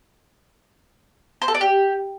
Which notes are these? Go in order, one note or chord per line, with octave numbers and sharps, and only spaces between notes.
C5
A4
D5
G4